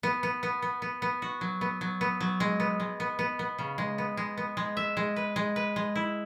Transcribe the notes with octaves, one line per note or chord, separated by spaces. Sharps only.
B3
B3
B3
B3
B3
B3
F#4
F#3
B3
F#3
B3
F#3
G#3
B3
G#3
B3
B3
B3
C#3
G#3
B3
G#3
B3
G#3
E5
G#3
B4
G#3
B4
G#3
E4